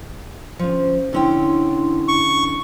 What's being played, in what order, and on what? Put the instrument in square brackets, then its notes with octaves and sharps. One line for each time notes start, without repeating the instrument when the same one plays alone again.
[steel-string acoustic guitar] D2 F3 [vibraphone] C#4 C5
[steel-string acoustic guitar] D3 C#4 G5 [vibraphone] D4 E4 C6
[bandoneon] C#6